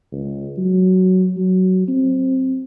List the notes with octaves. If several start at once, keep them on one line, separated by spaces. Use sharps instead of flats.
C#2
F#3
F#3
C4